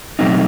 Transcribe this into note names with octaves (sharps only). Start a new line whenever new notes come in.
B2 F#3 A3 C4 D#4